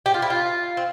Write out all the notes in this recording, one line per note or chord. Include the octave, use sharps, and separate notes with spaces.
G4
F4
E4
F4
C4